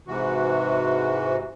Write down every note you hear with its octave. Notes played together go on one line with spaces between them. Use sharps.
G#2 C3 E3 F#4